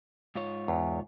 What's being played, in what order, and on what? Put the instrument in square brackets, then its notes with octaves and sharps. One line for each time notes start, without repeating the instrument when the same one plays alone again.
[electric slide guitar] G#2 F4 C#5
[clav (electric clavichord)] E2